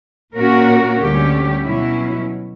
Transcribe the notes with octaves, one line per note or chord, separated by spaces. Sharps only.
A#2 A#3 C#4 F#4 A#4
D2 D3 G3 C#4 G4
B2 F#3 C#4 E4